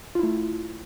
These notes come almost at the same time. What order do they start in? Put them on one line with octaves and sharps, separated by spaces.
F4 E4 A3